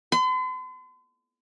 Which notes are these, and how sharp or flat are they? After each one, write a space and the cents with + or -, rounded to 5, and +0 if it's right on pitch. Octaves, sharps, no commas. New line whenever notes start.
C6 -45